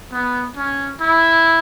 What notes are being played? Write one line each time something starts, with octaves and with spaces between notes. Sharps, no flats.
B3
C#4
E4